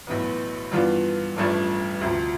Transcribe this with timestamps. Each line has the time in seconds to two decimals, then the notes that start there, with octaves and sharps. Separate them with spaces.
0.07 B1 A2 E3 B3
0.72 G2 E3 B3 D4 F4
1.37 A1 G2 F3 A3 D4
2.01 D2 C3 F3